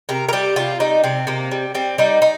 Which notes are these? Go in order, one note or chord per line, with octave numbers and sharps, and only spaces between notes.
C3 A#4
A#4
G3 G4
C3 F4
G3 D#4
C3 C4
C3 A#3
G3
G3 C4
G3 D#4
D#4